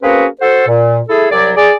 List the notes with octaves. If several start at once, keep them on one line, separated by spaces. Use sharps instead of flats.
A#3 C4 C#4 F#4 G#4 B4
F#4 A4 C5
A#2
E4 G#4 A4
C2 F#3 D5
G#4 D5